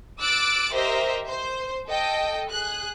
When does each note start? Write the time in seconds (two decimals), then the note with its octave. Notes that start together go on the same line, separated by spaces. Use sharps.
0.22 D6 E6 F#6 A6 D7
0.75 G4 A#4 C5 D#5 E5
1.28 C5
1.88 A4 D#5 G5
2.50 G#4 F#6